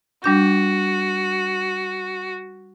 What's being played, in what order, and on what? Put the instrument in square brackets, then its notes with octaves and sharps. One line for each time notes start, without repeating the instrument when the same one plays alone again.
[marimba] G3 D4 G6 [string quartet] F#4